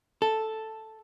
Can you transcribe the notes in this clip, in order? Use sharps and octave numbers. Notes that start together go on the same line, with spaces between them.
A4